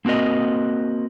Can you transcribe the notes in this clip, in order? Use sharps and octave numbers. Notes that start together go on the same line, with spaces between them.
A#3 C4 F#4 A#4 D#5